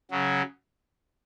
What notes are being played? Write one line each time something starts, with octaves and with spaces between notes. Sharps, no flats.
C#3 F#3